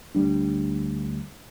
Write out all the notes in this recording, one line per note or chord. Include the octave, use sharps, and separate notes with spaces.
D2 G3 D4